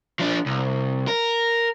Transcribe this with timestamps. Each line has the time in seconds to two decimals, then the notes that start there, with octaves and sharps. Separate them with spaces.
0.19 F3 D4
0.46 C2
1.08 A#4